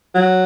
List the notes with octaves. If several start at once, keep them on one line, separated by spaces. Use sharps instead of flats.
F#3